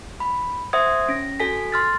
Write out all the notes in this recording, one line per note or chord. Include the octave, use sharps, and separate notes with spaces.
B5
C5 E5 F#5 C6 D#6 G#6
C#4 A#6
F#4 A4 G#5 B6
C6 F6 A6